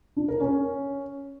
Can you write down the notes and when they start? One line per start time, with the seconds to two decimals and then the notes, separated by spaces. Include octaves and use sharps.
0.17 D4
0.28 A#4
0.40 C#4